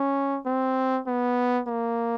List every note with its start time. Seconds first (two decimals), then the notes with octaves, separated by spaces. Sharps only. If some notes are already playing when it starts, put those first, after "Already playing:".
Already playing: C#4
0.46 C4
1.07 B3
1.68 A#3